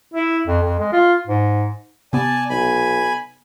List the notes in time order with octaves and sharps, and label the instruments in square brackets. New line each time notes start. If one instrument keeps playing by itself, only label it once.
[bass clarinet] E4
F2
F2
G#3
F4
G#2
[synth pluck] C3 B3 [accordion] D5 G#5 A5
[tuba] B1 [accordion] G#5 B5